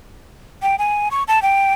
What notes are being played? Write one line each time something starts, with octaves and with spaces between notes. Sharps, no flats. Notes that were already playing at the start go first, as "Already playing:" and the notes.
G5
G#5
C#6
A5
G5